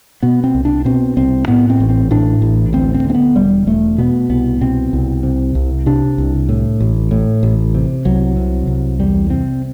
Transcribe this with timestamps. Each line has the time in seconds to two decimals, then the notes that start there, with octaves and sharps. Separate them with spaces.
0.23 B2 B3
0.44 C4
0.55 C2
0.65 D4
0.85 B2 C4
1.17 C2 C4
1.48 A2 B3
1.70 C4
1.80 A1
1.90 C4
2.11 A2 D4
2.42 A1
2.73 D2 C4
2.94 C4
3.04 D3
3.10 C4
3.15 B3
3.36 E1 G3
3.67 E1 A3
3.98 B2 B3
4.30 C2 B3
4.61 B2 C4
4.93 C2
5.23 C3
5.55 C2
5.86 C3 D4
6.18 C2
6.49 A2
6.80 A1
7.11 A2
7.43 A1
7.74 C3
8.05 C2 F#3
8.37 C3
8.67 C2
8.99 E2 G3
9.30 C3 C4